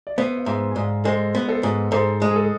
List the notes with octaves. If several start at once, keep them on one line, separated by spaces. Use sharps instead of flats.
D5
B3 C5 E5
F5
G#2 C5 E5
G#5
G#2 D5 F5
G#3 A4 C5
B3
A4 C5
G#2
G#2 A4 C5
G#3
G#4
A4